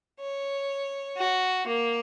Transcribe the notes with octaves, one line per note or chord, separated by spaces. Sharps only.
C#5
F#4
A#3